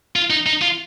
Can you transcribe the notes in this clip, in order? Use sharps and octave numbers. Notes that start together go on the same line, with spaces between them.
F4
D#4
D#4
F4